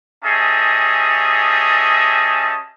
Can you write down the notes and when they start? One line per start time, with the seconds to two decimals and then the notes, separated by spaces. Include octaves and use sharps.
0.24 C#4 G4 G#4 D#5 E5 A5